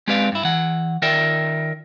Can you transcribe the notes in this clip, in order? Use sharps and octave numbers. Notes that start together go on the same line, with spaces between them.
G#3 C4 G4 B4 D5 F5
G2 E4
E3 F#5
D#3 F4 A#4 D5 E5 G5